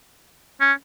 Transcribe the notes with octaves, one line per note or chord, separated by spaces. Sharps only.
C#4